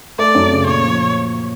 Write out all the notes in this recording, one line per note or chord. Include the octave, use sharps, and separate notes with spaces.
A3 D5
F#2
C#3
A#2 C#5
F3